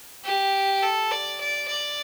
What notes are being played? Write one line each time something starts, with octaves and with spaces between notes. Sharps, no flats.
G4
A4
D5
D5
D5